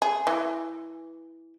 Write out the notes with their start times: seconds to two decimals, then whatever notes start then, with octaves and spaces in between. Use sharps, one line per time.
0.02 G#4
0.27 E3